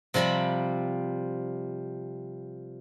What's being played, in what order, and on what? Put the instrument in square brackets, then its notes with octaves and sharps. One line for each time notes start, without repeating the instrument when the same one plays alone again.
[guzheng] C3 F3 G3 A#5 B5